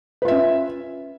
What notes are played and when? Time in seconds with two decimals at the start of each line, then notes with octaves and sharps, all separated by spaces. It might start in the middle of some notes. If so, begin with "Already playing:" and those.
0.22 B4
0.25 F4
0.28 E5
0.31 C#4